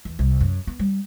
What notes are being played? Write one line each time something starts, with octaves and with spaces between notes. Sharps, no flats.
E2
C2
F#2
B3
G3